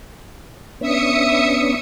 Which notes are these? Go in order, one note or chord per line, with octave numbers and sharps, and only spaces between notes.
B3 C#4 D4 E5 D#6 C#7